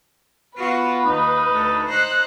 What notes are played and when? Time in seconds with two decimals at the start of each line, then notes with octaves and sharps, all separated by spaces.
0.58 B3 F4 F#4 B4
1.05 D#2 D#4
1.52 D2 A4
1.89 D#4 C5 F#6